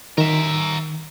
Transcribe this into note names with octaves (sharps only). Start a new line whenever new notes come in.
D#3 A#4 E5